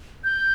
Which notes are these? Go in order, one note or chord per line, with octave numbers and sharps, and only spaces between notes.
G6